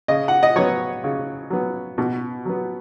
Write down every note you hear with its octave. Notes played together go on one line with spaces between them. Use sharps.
C#3 D#5
F#5
D#5
F#3 B3 C#5
C#3
F#3 B3
B2
F#3 B3